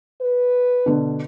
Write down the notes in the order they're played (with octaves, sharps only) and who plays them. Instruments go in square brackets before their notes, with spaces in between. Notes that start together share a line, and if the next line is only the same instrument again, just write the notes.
[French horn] B4
[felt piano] B2 D3